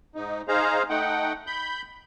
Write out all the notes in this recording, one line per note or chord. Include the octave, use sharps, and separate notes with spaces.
G#2 D#4
D#4 G#4 C5 F5 A#5
A3 D#4 F#5 G5
B5 G6